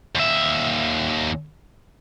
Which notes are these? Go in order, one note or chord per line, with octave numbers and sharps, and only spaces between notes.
D#2 E5